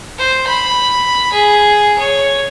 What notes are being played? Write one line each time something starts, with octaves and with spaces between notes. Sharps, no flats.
C5
B5
G#4
C#5